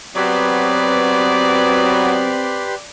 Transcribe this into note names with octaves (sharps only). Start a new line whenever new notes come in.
F#3 B3 C4 G4 B4 D5 C6